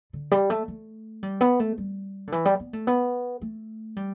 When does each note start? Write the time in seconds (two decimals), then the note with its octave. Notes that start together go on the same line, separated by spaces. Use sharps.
0.13 D3
0.31 G3
0.50 A3
0.68 A3
1.23 G3
1.41 B3
1.60 A3
1.78 G3
2.27 D3
2.32 E3
2.45 G3
2.60 B3
2.73 A3
2.87 B3
3.42 A3
3.96 G3